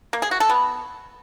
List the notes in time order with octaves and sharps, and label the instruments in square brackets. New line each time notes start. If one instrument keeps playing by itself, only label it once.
[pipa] A#3
G#4
F#4
A4
B3